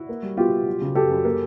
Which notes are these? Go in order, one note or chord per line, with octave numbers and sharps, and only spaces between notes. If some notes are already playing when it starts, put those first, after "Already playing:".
Already playing: E4 F#4
A#3
G3
B2 F4 G4
B2
F#3
C#3
F#2 G4 A4
F#2
A#3